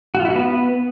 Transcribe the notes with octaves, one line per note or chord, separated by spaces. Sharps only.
F#4
F4
E4
F#4
B3